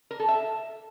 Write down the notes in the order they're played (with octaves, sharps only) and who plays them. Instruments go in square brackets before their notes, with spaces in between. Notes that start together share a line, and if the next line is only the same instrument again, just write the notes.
[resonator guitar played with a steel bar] A#4
A4
E5